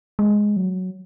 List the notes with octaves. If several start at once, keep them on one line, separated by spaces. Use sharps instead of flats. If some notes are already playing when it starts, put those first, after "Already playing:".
G#3
F#3